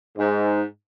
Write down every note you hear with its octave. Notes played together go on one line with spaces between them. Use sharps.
G#2